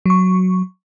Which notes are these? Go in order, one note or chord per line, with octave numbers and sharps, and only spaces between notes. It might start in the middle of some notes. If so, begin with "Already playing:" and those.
F#3 C#6